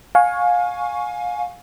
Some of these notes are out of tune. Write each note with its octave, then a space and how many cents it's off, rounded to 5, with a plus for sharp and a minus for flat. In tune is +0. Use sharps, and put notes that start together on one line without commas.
F5 +30 G#5 +5 C#6 +0